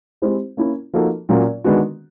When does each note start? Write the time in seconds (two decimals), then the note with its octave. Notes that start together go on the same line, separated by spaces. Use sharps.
0.22 G#3 C4 E4 G4 C5
0.57 A#3 C#4 E4
0.94 F3 A#3 D#4 F#4 A4
1.29 A#2 F#3 A#3 C#4
1.64 D#3 G#3 B3 D4 F#4